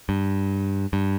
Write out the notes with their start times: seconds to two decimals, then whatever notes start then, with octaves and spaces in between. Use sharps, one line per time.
0.09 G2
0.93 G2